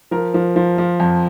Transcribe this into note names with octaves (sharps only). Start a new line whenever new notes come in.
F3 A#4
F3
F3
F3
F2